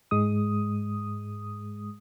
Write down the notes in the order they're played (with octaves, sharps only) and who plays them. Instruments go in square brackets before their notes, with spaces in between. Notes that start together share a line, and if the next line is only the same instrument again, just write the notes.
[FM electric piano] G#2 G#3 D#6